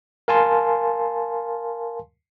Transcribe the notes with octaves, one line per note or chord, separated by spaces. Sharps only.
A#4 F5 G#5 A5 C6